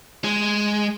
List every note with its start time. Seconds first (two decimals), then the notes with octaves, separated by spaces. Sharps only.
0.24 G#3